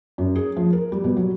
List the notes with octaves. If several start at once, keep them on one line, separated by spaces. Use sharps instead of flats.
F#2
G#4
F3
A#4
G3
B2
F#3